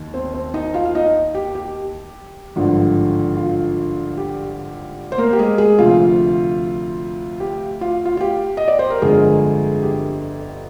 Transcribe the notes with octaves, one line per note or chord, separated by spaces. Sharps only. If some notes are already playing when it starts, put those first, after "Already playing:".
Already playing: D#2 D#3
C4 C5
C4 C5
D#4 D#5
F4 F5
F5
D#4 D#5
G4
G4
G#1 G2 D3 F3
F4
G4
C5
A#3 A#4
G4
G#3 G#4
G#3 G#4
D2 C3 F3 F4
G4
F4
F4
F4
G4
D#5
D5
C5
A#4
G1 F2 D3 G#3 G#4
G4